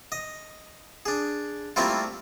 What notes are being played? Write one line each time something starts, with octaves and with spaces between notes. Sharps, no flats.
D#5
D4 G#4
G3 A3 A#3 C4 E4 F4